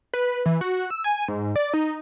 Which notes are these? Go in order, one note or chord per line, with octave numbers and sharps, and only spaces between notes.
B4
E3
F#4
E6
G#5
G#2
D5
D#4